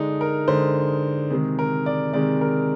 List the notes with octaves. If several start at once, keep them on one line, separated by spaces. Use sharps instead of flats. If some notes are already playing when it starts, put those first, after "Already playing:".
Already playing: D3 G#3 D4 D#4
A#4
D3 G#3 C5
C3 D#3 G#3 G#4
A#4
D5
C3 D#3 G#3 D5
A#4